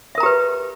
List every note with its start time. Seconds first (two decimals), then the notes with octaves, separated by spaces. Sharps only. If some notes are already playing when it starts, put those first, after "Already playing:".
0.15 E5
0.18 A#4
0.20 A#5
0.23 G4
0.26 B4